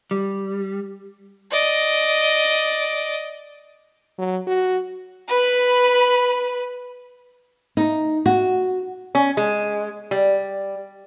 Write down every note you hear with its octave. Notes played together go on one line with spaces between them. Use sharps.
G3
D5 D#5
F#3
F#4
B4 B5
D#4
F#4
C#4
G#3
G3